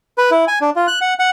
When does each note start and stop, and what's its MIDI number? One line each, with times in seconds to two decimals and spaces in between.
0.18 0.30 71
0.31 0.45 64
0.48 0.59 80
0.61 0.70 62
0.76 0.87 65
0.87 0.99 90
1.01 1.14 78
1.19 1.30 78